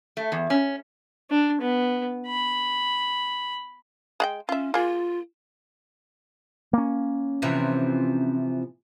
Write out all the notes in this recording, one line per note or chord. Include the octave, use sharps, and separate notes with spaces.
A3
E2
C#4
D4
B3
B5
G#3 F#5 G5
C#4 F4 E5
A#3 F4 G#4
A#3 C#4
C3 E3 F3